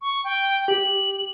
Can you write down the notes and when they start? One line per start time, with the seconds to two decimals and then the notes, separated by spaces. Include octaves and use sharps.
0.01 C#6
0.24 G5
0.68 G4 F#7